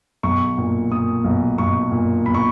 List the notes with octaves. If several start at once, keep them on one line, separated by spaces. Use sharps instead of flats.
B1 C#6
A#2
A#2 D#6
B1
B1 C#6
A#2
B1 B5
C#6